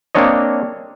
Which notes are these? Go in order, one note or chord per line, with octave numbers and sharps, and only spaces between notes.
A#3 C4 D4 C#5 D#5